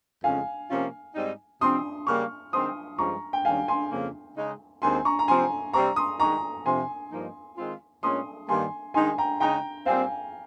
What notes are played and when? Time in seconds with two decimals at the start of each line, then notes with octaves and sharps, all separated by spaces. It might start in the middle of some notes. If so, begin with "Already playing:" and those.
0.24 F2 C#3 G#3 C#4 F5 G#5
0.69 C3 F3 A#3 C#4 F4
1.15 G#2 G3 C4 D#4
1.61 C3 F3 C4 C6 D#6
2.07 C#3 G3 A#3 C#6 F6
2.53 D#3 G#3 C4 C6 D#6
2.98 G2 F3 G#3 C#4 F4 A#5 C#6
3.33 G5
3.45 D#2 D#3 G3 C#4 F5 G#5
3.68 G#5 C6
3.91 F2 C#3 F3 A#3 F4
4.36 C#3 G#3 D#4
4.82 D#2 D#3 G#3 C4 G#5 C6
5.05 A#5 C#6
5.19 A#5
5.28 C3 F3 C4 G#5 C6
5.73 C3 G3 C4 A#5 C#6
5.96 C6 D#6
6.20 D#3 G#3 D#4 A#5 C#6
6.65 F2 C3 F3 C4 G#5 C6
7.12 G2 F3 A#3 D#4
7.58 D#3 G#3 C4 F4
8.03 A#2 G#3 C#4 C6 D#6
8.49 G2 D#3 G3 A#3 G#5 C6
8.94 D#3 G#3 D#4 G#5 C6
9.18 G5 A#5
9.40 C#3 G#3 D#4 G5 A#5
9.86 A#2 G3 C4 F5 G#5